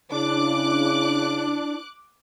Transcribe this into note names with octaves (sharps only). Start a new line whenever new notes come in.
C#3 D4 E4 D6 F#6